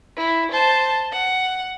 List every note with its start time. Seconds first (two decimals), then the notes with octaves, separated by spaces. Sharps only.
0.16 E4
0.51 C5 A5
1.12 F#5